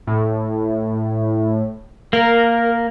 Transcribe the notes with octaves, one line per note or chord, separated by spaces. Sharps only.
A2
A#3 A#4